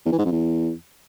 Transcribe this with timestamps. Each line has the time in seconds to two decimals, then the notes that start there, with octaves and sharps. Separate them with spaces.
0.05 E2
0.12 E3
0.18 G#2
0.25 F2
0.31 E2